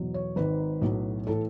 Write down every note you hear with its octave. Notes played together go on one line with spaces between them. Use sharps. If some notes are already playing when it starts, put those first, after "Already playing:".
Already playing: E2 B2 F#3
C#5
G#1 G#2 D#3 B4
B1 A2 F#3
A2 E3 A4